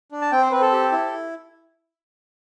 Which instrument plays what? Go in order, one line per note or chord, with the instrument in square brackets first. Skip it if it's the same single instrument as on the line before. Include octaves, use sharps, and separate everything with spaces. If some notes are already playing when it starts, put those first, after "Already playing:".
[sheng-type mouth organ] D4
A5
C4 G5
C5
C4 B4
A4
G4
E4